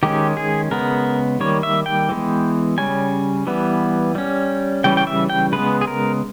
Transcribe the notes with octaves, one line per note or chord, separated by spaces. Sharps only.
D#3 G#3 C#4 G4
G#4
C#3 G#3 B3 A#4
D#3 G3 A#3 C#5
E5
G5
E3 G#3 B3
C#3 G3 C#4 G#5
E3 G3 B3
G3 C#4
C#3 E3 G3 C#4 G5
G5
E5
G5
C#3 G#3 B3 B4
G#4
A#4